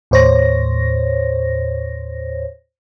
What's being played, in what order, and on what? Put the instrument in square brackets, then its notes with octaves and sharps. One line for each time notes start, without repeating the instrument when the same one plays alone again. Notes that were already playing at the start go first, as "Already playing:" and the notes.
[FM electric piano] D#2 A2 C5 C#5 A#6